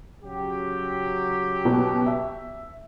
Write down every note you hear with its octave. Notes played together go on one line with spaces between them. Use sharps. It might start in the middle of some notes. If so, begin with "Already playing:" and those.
C#3 F#3 G4
B2
E5